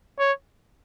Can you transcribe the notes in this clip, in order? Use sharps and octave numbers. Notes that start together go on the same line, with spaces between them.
C#5